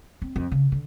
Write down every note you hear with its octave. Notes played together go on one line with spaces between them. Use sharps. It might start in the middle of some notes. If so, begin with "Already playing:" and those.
C4
F2
C#3
D3